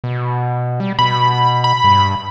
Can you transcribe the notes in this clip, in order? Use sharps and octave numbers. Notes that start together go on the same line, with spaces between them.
B2
G3
B2 B5
B5
G2